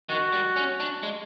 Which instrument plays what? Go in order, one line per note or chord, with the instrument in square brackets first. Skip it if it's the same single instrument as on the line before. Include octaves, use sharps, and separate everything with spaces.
[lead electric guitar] D#3 [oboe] F#4
[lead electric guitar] G3
C#4
D4
G#3